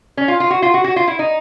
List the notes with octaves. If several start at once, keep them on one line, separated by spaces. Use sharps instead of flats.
C#4
F4
F4
F#4
F4
F#4
F#4
F4
E4
D#4